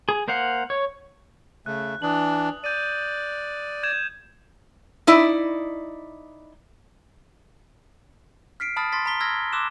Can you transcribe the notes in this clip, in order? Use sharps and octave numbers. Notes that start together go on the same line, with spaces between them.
G#4
A#3 C5 F5 F#5
C#5
C#3 A3 F#6
E3 D4 D#6 F#7
D5 G6 D#7
G6 G#6 E7
D#4 E4 D5
F6 B6 C7 D7
A5 B5 D#6 F6 A6
C6 A6 B6
A#5 C6 B6 G7
E6 F6 G#6 A#6
C6 D6 E6 F#6 E7